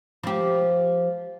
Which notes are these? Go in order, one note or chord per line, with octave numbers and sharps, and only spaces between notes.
F3 G4